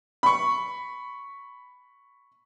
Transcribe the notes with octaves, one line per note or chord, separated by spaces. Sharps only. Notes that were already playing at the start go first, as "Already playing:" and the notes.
B5 C#6